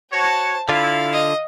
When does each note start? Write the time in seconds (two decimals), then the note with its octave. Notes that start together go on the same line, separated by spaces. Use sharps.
0.12 F#4 C5 C#5 A5
0.69 D3 E4 F4 F5
1.12 D#5